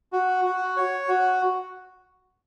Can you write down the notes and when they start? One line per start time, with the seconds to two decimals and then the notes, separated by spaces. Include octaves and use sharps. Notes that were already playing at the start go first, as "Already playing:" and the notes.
0.13 F#4
0.45 F#4
0.77 C#5
1.08 F#4